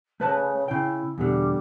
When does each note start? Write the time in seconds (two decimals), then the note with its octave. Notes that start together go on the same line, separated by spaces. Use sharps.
0.20 C#3 A3 B4 A5
0.68 C#3 E4 G5
1.18 E2 B2 D3 G3